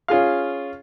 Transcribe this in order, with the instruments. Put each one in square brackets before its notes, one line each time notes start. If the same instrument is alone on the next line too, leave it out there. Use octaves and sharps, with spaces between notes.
[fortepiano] C#4 F4 G#4 F5